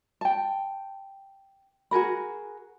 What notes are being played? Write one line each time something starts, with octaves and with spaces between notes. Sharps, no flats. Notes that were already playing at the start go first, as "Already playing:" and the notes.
G5 A5
F#4 G#4 A#4 B5